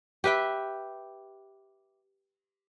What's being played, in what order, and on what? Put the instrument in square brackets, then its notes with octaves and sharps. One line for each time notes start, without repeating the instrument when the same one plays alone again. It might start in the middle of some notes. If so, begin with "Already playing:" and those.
[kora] G4 B4 E5 G5